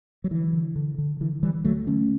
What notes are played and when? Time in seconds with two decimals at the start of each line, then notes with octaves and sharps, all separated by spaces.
0.24 F#3
0.31 D3 E3
0.53 D3
0.76 D3
0.98 D3
1.21 D3 E3
1.43 D3 E3 G3
1.64 D2 F#3 A3
1.87 D3 A3 C#4